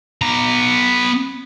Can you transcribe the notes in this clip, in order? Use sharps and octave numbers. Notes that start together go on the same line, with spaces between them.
B3 A#5